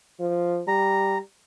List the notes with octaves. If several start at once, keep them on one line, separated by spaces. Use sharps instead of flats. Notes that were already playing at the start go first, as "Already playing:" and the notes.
F3
G3 A#5